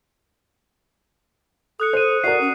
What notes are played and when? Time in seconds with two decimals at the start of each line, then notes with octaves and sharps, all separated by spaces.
1.80 A4 D#6 F#6 C#7
1.93 C5 F#6 D#7
2.24 F#4 A#4 D5 C7
2.41 C#4